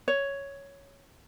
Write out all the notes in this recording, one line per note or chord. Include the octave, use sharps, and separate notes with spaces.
C#5